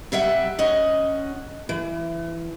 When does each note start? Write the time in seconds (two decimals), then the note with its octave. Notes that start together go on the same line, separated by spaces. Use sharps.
0.12 C3 G3 E5 F#5
0.59 C#4 D#5 F#5
1.69 E3